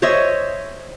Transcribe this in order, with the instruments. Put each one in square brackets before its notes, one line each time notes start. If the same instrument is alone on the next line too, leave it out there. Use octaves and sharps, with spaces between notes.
[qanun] C5 C#5 D#5 E5